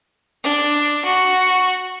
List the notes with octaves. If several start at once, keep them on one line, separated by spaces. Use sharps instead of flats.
D4
F#4